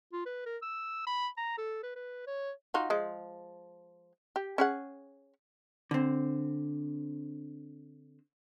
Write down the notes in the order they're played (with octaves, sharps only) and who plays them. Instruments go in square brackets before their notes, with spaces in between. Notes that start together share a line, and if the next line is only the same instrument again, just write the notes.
[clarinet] F4
B4
A#4
E6
B5
A#5
A4
B4
B4
C#5
[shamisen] D#4 F4 F#4
F3 G#3
G4
C#4 G#4 F#5
[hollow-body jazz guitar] D3 C4